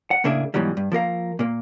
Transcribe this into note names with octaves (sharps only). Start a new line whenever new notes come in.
F#5
A2 C#3 A#3 D4 G#4 E5
G#2 B2 E3 F#3 G3
G2
F3 A#3 A#4 F5
A#2 A#3